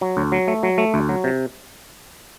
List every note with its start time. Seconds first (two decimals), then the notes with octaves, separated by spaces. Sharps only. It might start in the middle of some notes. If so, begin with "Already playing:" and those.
0.01 F#3
0.17 D2
0.32 F#3
0.48 A3
0.63 F#3
0.78 A3
0.94 D2
1.09 F#3
1.24 C3